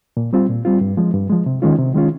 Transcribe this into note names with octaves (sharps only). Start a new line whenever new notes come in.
A#2
G3 C4 F4
A#2
G3 C4 F4
G2
F3 G#3
G2
F3 G#3
C3
D#3 G#3 C#4 F4
C3
D#3 G#3 C#4 F4